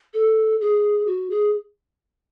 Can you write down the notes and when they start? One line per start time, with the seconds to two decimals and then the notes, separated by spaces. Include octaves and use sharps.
0.14 A4
0.61 G#4
1.07 F#4
1.30 G#4